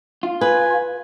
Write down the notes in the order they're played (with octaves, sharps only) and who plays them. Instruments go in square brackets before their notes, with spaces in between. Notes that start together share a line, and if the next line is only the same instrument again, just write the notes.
[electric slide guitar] F4
[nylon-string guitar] B4 [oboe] G#5